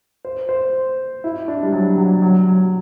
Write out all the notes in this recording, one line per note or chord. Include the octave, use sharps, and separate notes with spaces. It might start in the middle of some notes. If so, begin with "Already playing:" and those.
C5
C5
E4
D4
G3
F#3
F#3
F#3
F#3